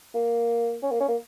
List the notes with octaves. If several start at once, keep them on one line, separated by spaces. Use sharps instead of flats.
A#3
C#4
A#3
C#4
A#3